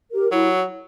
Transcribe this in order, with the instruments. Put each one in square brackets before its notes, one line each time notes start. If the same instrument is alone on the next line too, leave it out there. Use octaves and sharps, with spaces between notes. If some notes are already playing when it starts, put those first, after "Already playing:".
[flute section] G4 A#4
[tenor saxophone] F#3 [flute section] E4